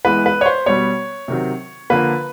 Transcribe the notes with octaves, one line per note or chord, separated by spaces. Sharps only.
E3 G#3 B3 B4
B4
C#5
C5
B2 G3 B3 C#5
C3 D#3 F#3
D3 F3 A#3 B4